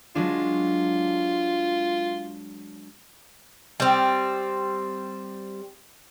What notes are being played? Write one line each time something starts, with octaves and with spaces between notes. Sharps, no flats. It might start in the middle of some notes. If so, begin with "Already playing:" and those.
F#3 G#3 D4 F4
G3 C4